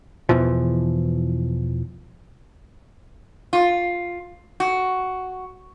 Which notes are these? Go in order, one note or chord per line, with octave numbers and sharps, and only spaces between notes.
E2 B2 E3 F3
F4
F#4